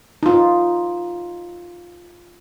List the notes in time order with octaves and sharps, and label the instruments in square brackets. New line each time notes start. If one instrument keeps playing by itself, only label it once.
[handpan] D#4 F4